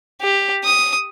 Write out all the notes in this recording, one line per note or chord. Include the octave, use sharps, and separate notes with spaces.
G4
D#6